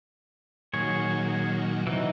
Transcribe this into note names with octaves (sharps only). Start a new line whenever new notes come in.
A#2 D#3 F#3 G#4 C#5
C3 E3 F#3 D#4